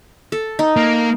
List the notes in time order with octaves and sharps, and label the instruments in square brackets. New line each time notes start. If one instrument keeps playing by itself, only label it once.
[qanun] A4
D#4
[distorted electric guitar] A#3